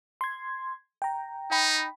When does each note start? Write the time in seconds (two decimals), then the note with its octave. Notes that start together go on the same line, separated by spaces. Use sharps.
0.21 C6 G#6
1.02 G5 A#5
1.51 D#4 G5 B5